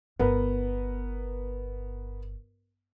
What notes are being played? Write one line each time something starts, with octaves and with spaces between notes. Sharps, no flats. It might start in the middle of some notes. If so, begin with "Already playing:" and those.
G1 B3 A#4 B4